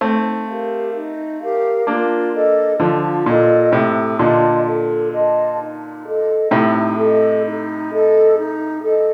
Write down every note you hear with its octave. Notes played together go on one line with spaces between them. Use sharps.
A3 C4 D#4
G4 A#4 F5
D#4
G4 A#4 F5
A#3 D4 F4
A4 D#5
D3 F3 F4
A#2 A4 D#5
A2 C3 A4
A#2 D3 D#5 A5 C6
A4
D#5 A5 C6
D#4
A4 D#5
A2 C3 D#4
A4 D#5
D#4
A4 D#5
D#4
A4 D#5